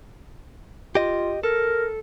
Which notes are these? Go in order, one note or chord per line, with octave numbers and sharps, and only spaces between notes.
F4 G4 D#5
A4 A#4